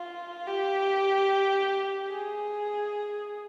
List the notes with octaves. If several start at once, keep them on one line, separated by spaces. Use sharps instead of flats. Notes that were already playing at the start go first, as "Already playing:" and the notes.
Already playing: F4
G4
G#4